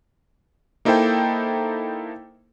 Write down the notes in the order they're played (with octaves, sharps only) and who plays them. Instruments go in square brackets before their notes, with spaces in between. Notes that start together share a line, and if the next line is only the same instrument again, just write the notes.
[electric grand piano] A#3 D#4 E4 A4 C5 G5